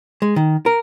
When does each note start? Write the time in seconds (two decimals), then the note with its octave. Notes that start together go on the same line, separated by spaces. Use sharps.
0.22 G#3
0.36 D#3
0.66 A#4